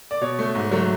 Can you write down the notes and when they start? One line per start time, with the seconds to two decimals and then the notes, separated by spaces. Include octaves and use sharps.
0.11 D5
0.21 B2 C#5
0.39 A3
0.55 G#2
0.71 F#3 A3